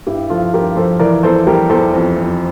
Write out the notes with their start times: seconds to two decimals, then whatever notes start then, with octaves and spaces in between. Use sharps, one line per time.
0.07 G2 E4 G4
0.30 F3 F4 A4
0.53 G2 G4 A#4
0.76 F3 A4 C5
0.99 E3 A#4 D5
1.23 E2 A4 C5
1.47 G3 G4 A#4
1.70 E2 A4 C5
1.94 F2
2.17 F2